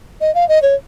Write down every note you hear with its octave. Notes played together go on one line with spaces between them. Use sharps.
D#5
F5
D#5
C#5